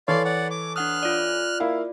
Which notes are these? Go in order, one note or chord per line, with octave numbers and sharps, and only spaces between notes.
E3 A4 C#5 D5 F5 C6
D5 F#5
D6
D4 F#5 D#6 F6 F#6
F4 D5
A#3 E4 F5